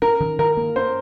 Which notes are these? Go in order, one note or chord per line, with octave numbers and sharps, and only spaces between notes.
C#4 A#4
D#3
D#3 A#4
A#3
C#4 C5